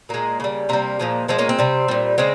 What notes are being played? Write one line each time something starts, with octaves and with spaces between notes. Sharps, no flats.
A#2 G#3 A#3
C#3 G3
C3 G3 A#3
A#2 F3 G#3
A#2 F3 G#3 C4
A#3 C#4
C4
C3 G3
A#2 G3
C#3 G#3 C4